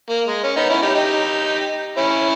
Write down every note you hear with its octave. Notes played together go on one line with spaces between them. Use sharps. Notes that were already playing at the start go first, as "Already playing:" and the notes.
A#3
G#3
C#4
B3 D#4
C#4 E4
D#4 G4
D#4 G4
C#4 E4